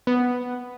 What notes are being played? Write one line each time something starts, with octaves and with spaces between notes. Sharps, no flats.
B3